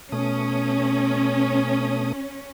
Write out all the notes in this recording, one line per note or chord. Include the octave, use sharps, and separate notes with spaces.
B2 A3 C#4 D#6